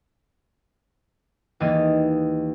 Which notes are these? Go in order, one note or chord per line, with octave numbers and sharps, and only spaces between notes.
D#2 E3 A#3 G#4 D#5 A6